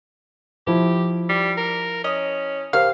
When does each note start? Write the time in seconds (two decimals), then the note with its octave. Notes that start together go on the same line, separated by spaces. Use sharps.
0.67 F3 E4 G4
1.29 G3
1.57 A#4
2.04 C#4 D#5
2.73 G4 A#4 C5 F5